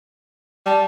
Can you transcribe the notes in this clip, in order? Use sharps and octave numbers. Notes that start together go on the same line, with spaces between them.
G3 A5